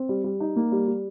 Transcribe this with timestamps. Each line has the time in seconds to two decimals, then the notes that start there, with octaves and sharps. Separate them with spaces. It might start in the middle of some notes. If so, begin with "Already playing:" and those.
Already playing: C4
0.09 G3
0.24 G3
0.40 D#4
0.56 A#3
0.72 G3
0.88 G3